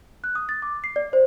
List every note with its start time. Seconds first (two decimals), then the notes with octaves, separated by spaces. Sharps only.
0.24 F#6
0.35 D#6
0.49 A6
0.62 D6
0.84 C7
0.96 D5
1.13 C5